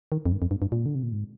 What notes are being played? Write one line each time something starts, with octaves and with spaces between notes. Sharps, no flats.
D#3
F2
G2
F2
G2
G2
A#2
D3
C3
A#2
G#2